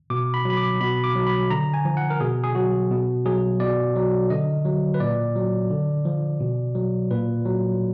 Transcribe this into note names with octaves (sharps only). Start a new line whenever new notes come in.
B2 D6
B5
F#3 B5
D6
B2 B5
D6
F#3
B5
D3 A#5
G#5
F3
F#5
A#4
B2 G#4
G#4
F#3 F#4
B2
F#3 G#4
B2 D5
F#3
D3 D#5
F#3
B4
A#2 D5
F#3
D3
F3
B2
F#3
A#2 B4
F#3